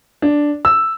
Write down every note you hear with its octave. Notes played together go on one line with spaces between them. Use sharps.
D4
E6